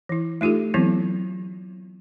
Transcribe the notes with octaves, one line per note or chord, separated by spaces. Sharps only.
E3 E4
A3 D#4 F4 G4 A4
E3 F#3 B3 C4 E4